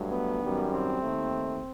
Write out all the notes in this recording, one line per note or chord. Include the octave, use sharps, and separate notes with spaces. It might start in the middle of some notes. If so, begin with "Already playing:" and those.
Already playing: G2 F#3 A3
B3
F#2 D#3 G3
C4
D#2 D#3 A3